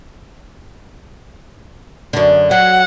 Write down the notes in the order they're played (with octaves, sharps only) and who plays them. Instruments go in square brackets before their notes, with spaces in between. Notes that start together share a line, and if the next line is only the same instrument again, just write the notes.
[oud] F#2 D3
[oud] F#3 [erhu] F#5